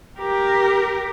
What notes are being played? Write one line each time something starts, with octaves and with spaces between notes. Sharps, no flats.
G4 A#4